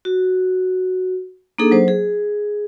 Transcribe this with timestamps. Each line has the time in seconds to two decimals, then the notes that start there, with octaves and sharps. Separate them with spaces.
0.05 F#4
1.58 A#3 D4 D#4 G#4 A4
1.72 F#3 C5
1.88 G#4